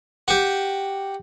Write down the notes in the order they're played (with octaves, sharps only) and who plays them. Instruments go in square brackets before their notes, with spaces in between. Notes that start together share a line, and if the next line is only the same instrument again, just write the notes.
[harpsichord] F#4 G4